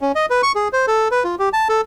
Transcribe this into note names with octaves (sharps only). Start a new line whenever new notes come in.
C#4
D#5
B4
C#6
G#4
C5
A4
B4
F4
G4
A5
A4